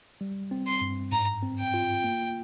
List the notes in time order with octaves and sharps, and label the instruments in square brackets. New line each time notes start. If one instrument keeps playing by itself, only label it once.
[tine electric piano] G3
C4
[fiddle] C6
[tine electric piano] G2
[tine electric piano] G#2 [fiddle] A#5
[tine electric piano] C4
[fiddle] G5
[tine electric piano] F4
A#3